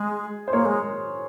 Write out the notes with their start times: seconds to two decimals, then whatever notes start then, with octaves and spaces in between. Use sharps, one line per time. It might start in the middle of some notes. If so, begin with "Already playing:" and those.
Already playing: G#3 G#4
0.48 C5
0.52 A#3 A#4 C#5
0.65 G#3